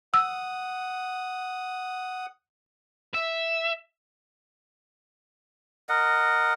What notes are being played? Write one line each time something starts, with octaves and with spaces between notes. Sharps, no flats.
F#5 D#6 E6
E5
A#4 D#5 F#5